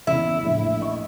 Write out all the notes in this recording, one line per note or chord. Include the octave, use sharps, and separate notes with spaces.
E2 C#3 E4
A#1 A2
D#5 C#6